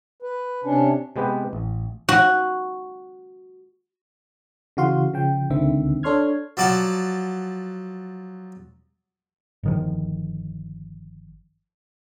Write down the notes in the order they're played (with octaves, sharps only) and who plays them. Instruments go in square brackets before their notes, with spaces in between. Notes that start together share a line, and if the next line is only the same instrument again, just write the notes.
[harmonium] B4
C3 C#4 D4
[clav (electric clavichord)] C3 G#3 B3 G4 B4
A1
[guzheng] F#4
[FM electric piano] C#3 E3 F#4 F5 C6
C#3 F3 G5
C#2 D3 D#3 C4 E5
D4 A4 C#5 C6 F6 G#6
[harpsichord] F3 F#3 D5 F#5 A5
[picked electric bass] G1 D#3 F3